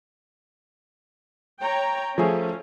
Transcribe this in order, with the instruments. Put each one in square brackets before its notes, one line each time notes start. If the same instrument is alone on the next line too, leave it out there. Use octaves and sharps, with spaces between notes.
[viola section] C#5 G5 A#5
[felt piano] F3 A3 G#4 [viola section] C#4